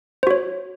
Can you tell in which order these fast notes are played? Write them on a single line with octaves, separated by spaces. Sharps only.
C5 F#4 C#5